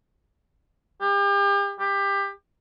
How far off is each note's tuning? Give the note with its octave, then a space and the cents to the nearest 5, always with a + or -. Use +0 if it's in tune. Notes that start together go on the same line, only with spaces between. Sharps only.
G4 +40
G4 +20